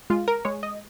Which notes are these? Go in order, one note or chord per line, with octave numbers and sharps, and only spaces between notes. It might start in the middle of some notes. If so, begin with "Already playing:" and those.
G#3 F4
A#4
G#3 C#5
D#5